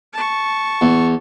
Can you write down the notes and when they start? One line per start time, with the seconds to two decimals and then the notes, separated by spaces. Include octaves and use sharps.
0.13 A5 C#6
0.81 E2